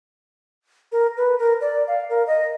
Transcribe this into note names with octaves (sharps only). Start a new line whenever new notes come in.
A#4
B4
A#4
D5
F5
A#4
D#5